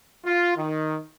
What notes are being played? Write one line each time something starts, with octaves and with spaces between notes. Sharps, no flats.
F4
D#3